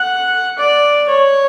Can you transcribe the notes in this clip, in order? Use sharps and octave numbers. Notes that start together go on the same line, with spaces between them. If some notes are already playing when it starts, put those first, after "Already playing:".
Already playing: F#5
D5
C#5